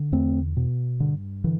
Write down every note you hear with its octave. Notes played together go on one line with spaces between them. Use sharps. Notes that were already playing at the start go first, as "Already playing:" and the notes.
Already playing: D3
E2 A3 C4
B2
G2 D3
D3 E3